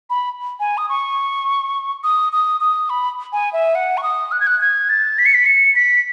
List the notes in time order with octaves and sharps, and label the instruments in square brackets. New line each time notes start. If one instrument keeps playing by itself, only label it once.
[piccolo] B5
G#5
D#6
C#6
D#6
D#6
D#6
B5
G#5
E5
F#5
C#6
D#6
F#6
G#6
F#6
G#6
A6
B6
C#7
B6
C#7
B6